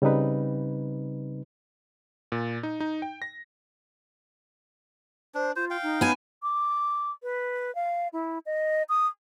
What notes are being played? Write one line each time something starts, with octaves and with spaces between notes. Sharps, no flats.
C#3 G3 C4 D#4 B4
A#2
D#4
D#4
G5
A#6
D4 C5
F4 C5
F5 G5
D#4
B3 G#5
D6
B4
F5
E4
D#5
D#6